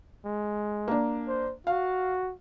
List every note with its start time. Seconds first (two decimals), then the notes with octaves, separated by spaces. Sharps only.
0.25 G#3
0.88 A#3 D4
1.28 C5
1.67 F#4 F5